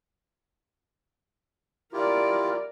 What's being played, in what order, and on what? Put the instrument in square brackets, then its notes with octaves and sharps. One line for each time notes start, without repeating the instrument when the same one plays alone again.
[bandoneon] E4 F4 G4 [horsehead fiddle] A#4 D5